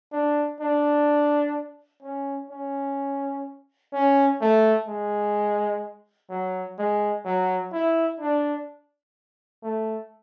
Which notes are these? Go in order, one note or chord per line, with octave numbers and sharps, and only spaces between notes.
D4
D4
C#4
C#4
C#4
A3
G#3
F#3
G#3
F#3
E4
D4
A3